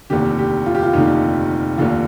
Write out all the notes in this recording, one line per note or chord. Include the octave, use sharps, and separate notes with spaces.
F1 D#2 D3 G4
G4
F4
G4
F4
F1 D#2 D3 D#4
F1 D#2 D3 F4